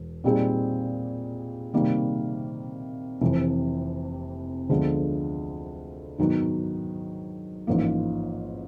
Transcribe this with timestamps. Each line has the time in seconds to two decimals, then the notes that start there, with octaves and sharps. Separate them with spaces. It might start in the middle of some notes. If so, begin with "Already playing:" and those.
Already playing: E1
0.24 A#2 G3 C4 D#4 G#4
1.73 C3 D#3 G3 A#3
3.21 F1 F2 C3 E3
4.69 D2 D3 F3 G#3 B3
6.18 G#2 D#3 F#3 B3
7.67 A1 G#2 F3 A#3